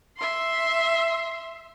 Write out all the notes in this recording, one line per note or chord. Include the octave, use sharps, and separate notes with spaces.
E5 C6